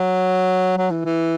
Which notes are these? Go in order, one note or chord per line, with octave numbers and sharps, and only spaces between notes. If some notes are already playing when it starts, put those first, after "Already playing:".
Already playing: F#3
F#3
E3
E3